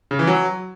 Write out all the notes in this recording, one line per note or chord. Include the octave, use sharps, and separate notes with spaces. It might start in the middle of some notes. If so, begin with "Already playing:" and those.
C#3
E3
F#3